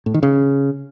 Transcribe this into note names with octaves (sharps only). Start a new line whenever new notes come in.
A2
D#3
C#3